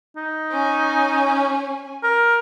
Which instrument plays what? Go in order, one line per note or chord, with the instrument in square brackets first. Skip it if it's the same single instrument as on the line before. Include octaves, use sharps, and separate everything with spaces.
[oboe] D#4
[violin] C#4 G#5
[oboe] A#4